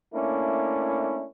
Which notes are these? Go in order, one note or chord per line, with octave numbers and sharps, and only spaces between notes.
A3 A#3 C#4 D4 E4